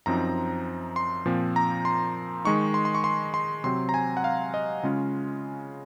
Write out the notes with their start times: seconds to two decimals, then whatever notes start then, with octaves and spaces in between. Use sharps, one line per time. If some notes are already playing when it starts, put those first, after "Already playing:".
0.06 F#2 F3 C4 D#4 A#5
0.96 C6
1.25 A#2 F3 C4
1.56 A#5
1.85 C6
2.45 D#3 G#3 D#4 C#6
2.74 C6
2.85 C6
2.95 C#6
3.04 C6
3.34 C6
3.64 C3 F#3 C4 C6
3.89 A#5
3.94 G#5
4.17 F#5
4.24 F5
4.54 D#5
4.83 C#3 G#3 C#4 F4